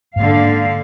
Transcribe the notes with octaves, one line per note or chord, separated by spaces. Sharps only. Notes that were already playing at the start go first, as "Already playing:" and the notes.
G#2 D3 A#3 F5